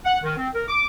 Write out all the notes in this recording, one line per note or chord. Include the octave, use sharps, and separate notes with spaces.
F#5
D#3
C4
A#4
D6